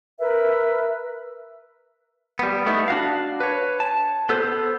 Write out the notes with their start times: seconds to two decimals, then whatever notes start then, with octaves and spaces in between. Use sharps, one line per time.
0.19 A#4 B4 E5
2.39 G3 B3
2.66 A3 B3 D#4 E4
2.88 D4 F#4 F5
3.40 B4 C#5
3.80 A5
4.29 B3 A4 C5